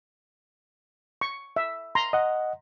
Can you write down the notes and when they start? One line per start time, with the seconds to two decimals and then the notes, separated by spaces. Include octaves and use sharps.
1.21 C#6
1.56 E5
1.95 A#5 C6
2.13 D#5 F#5